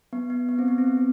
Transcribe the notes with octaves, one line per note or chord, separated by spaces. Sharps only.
B3
B3
B3
C4
B3
C4
B3
C4